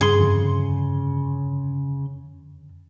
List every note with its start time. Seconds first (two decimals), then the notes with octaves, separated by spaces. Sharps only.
0.01 G2 C#3 G#4 C6
0.16 F2 D3